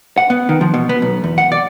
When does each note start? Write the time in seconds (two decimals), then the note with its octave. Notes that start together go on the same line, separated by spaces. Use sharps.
0.18 F#5
0.30 B3
0.49 D#3
0.61 F3
0.74 B2
0.89 B3
1.02 B1
1.24 E2
1.38 F#5
1.52 D5